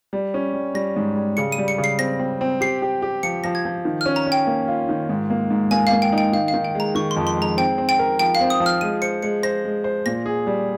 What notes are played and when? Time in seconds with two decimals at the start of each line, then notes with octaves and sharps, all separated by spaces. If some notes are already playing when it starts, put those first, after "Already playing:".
0.13 G3
0.34 C#4
0.54 G3
0.75 G3 A#6
0.96 G#2
1.16 G3
1.37 C#3 C#7
1.52 D#7
1.58 G3
1.68 C#7
1.78 C#3
1.84 C7
1.99 C4 A#6
2.19 C4
2.41 C4
2.61 G4 C7
2.82 G4
3.02 G4
3.23 F3 C#7
3.44 F3 A#6
3.55 G#6
3.65 F3
3.85 D#3
4.01 C#4 F6
4.16 A#5
4.27 C#4
4.32 G5
4.47 A#3
4.68 F4
4.89 D#3
5.09 G#2
5.30 A#3
5.50 G#2
5.71 A#3 G#5
5.87 F5
5.92 A#3
6.02 G5
6.12 D#4
6.18 G5
6.33 D#3 F5
6.48 F5
6.54 D#3
6.65 G5
6.75 G#3 A#5
6.95 D#3 C#6
7.11 C6
7.17 F2
7.27 C6
7.37 G#3
7.42 A#5
7.57 C4 G5
7.78 C4
7.89 G5
7.99 A#4
8.19 F3 G5
8.35 F5
8.41 C4
8.50 D#6
8.60 F3
8.66 F6
8.81 G#3 D#7
9.02 C5 C#7
9.23 G#3 C#7
9.43 C5 A#6
9.65 G#3
9.84 C5
10.06 A#2 A#6
10.26 G#4
10.47 G3